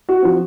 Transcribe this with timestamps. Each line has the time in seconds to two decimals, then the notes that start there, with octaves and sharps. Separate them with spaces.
0.09 F#4
0.22 F3 C4